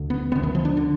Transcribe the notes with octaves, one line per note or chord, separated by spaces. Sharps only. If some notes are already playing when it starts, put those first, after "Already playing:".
Already playing: D2 D3
B3
D2 D3 B3
D#3
F3
D4
D3